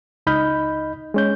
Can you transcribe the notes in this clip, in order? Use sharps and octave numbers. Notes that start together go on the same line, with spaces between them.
C#2 D#4 D#5 B5 F6 G6
G#3 C#4 G6